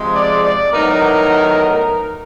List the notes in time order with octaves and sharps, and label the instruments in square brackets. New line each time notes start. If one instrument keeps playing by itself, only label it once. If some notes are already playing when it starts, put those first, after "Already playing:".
Already playing: [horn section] C3 F3 G#3
[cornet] D5
D5
[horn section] A2 F#3 B3 D#4 [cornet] A#4